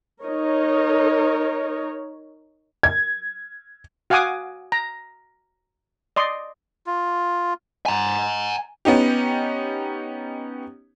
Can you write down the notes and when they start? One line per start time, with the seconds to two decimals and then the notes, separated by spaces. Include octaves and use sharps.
0.22 D#4 A#4 C#5
2.83 G#6
4.10 F#4 F5 F#5 G#5 D6 D#6
4.72 A#5
6.16 D5 D#5 C6
6.86 F4
7.86 G#5 A#5
8.85 B3 C#4 D#4 G4